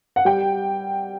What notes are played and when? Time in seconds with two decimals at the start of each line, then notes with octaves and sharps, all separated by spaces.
0.16 F#5
0.25 G3 G5